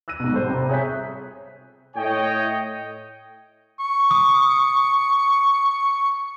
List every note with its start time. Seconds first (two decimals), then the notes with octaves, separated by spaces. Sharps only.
0.08 E6 F#6 A#6 D#7
0.20 G#2 B2
0.33 G3 A4 C5
0.49 C3 A#5
0.69 G#4 C#5 E5 F#6 G6 B6
1.96 A2 C#5 D#5 G5
3.80 C#6
4.11 D#6